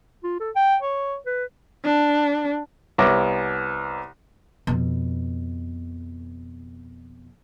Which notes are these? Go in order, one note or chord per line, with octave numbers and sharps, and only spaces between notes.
F4
A4
G5
C#5
B4
D4
C2 B3 C#5 E5 D6 A#6
F2 B2